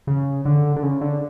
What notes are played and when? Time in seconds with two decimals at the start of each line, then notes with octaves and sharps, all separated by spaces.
0.07 C#3
0.45 D3
0.76 D3
0.83 C#3
1.01 D3